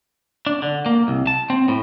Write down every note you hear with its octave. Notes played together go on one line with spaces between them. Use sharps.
D4
D3
A#3
C2
A5
C4
A2